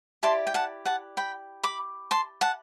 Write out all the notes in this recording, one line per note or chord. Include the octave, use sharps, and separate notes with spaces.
E4 G4 D5 A5 C6
G5
F#5 A5
F#5 A5
G5 B5
B5 D6
A5 C6
F#5 A5